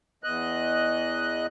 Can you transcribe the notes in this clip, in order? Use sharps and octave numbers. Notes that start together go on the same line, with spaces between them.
E2 D#5 F#6